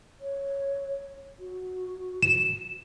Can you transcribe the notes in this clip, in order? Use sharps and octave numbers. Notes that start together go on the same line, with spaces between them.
C#5
F#4
E7